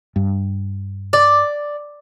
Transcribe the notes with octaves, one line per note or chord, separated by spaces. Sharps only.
G2
D5